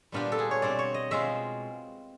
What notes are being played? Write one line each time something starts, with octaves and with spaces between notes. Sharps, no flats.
A#2 G3 B3 D4 F4 G4
A4
G#4
C#5
B2 G3 C4 D5
C#5
D#5
B2 G#3 C4 F4 E5